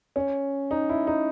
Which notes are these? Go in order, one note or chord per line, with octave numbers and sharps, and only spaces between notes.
C#4
D#4
E4
D#4